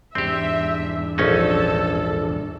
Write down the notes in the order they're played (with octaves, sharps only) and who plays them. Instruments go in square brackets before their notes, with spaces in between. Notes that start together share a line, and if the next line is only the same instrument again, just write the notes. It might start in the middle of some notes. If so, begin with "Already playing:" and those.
[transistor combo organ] E2 G#2 D4 [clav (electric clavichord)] C4 G4 [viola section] E5
[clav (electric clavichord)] A#1 C#4 D#4 [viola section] A4